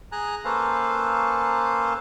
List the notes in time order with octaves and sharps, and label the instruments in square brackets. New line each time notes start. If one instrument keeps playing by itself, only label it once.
[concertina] G#4 G#5 A#5 F#6
A#3 C#4 A4 B4 C5 F5